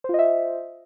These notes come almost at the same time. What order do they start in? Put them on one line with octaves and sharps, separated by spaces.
C5 F4 D#5 E5